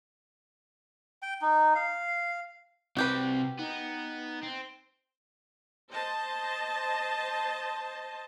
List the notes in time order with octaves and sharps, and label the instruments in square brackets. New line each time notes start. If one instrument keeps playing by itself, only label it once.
[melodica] G5
D#4
F5
[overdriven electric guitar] C3 G3 [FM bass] C4 [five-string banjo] F#4 G4 B4
[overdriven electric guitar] B3 [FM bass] D#4
[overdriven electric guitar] C4
[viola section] C5 D#5 A5